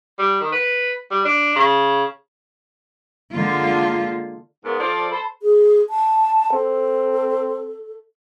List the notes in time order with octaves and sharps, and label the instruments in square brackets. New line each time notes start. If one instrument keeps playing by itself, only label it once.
[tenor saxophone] G3
D#3
B4
G3
D4
C#3
[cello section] D3 G#3 A#3 F4
[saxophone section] G#2 C#3 B3 [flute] A#4
[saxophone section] F3 D5 [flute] A4
[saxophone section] A4 C5 [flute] B5
[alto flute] G#4
A5
[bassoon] C4 [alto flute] A4